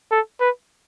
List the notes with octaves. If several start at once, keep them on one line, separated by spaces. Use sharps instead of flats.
A4
B4